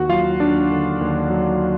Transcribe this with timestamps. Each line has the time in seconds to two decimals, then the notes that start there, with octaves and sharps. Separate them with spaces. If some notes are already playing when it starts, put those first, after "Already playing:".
Already playing: D#2 F#4 F#5
0.09 F#3 F4 F5
0.40 D#2 D4 D5
0.70 D3
1.01 D#2
1.30 F#3